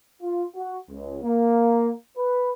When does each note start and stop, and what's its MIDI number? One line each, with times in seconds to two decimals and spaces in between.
0.22 0.45 65
0.56 0.77 66
0.91 1.19 37
1.23 1.91 58
2.17 2.50 71